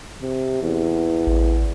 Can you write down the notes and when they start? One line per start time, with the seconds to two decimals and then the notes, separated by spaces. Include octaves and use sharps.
0.22 C3
0.62 E2
1.27 A1